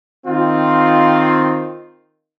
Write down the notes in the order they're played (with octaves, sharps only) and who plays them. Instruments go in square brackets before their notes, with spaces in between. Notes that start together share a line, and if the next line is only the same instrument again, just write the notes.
[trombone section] D#3 C4 F4